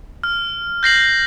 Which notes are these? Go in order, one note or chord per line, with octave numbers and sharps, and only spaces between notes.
F6
G6 A#6 C7 F#7